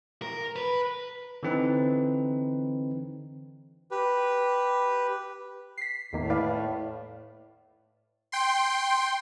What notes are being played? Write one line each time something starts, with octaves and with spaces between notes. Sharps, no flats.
A#4
B4
D3 E3 C4 D#4 B4
G4 B4
B6 C7
E2 A2 D#3 A#3
B4 D5 F5
G5 C6